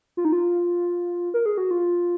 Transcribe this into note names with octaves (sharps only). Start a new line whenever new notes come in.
F4
D#4
F4
A#4
G#4
F#4
F4